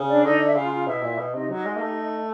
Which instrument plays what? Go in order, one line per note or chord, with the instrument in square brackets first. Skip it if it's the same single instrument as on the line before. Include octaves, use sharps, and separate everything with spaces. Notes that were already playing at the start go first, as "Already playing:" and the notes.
Already playing: [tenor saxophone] C#3
[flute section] D4 D5
[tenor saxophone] D3 [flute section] D#4 D#5
[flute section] D5
D#5
E5
[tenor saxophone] C#3 [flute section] F4 F5
[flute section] F4 F5
[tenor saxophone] B2 [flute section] E4 E5
[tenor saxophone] A#2
B2
[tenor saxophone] C3 [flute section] D#4 D#5
[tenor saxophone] F#3 [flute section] D#4 D#5
[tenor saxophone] G#3
A#3
[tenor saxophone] A3 [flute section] G4